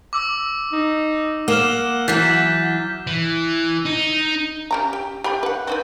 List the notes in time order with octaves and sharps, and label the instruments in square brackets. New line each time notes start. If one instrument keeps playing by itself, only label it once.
[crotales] D6 E6
[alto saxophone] D#4
[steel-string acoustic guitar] A#3 [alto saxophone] F#5 [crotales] F6 E7 G7
[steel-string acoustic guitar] E3 F#3 [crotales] G6 A6 B6
[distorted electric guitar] E3
D#4
[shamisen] C#4 G4 A#5
G4
G4 G5 B5
B4 F#5
C4 D#4 B4